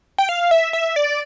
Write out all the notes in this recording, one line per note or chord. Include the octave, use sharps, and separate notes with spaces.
G5
F5
E5
E5
D5